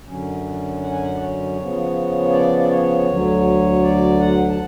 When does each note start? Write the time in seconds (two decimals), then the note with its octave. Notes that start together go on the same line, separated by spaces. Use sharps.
0.06 F#2 D3 F#3 C#4
0.82 F#5
0.91 G#5
1.02 F#5
1.14 D5
1.19 C#5
1.57 C#3 F3 B3
2.32 D5
2.59 D5
2.70 C#5
3.07 D2 D3 F#3
3.82 D5
4.20 F#5
4.49 A5